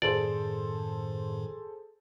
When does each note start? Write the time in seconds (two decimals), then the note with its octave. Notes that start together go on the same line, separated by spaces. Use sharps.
0.02 F#2 A2 D#3 G#4 A4 C5 D5